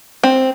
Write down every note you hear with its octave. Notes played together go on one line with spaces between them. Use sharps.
C4